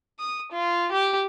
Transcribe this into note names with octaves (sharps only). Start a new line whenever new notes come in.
D#6
F4
G4